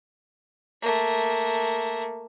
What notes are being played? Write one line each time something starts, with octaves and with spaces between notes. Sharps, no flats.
A3 A#3